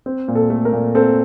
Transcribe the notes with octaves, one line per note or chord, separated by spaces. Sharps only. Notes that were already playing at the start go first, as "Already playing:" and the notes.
C4
A#2
A4
A3
A#4
A#2
C4 A4